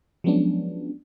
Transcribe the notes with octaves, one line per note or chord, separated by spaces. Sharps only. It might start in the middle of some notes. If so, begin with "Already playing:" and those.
F3 F#3 G#3 B3 C#4 D4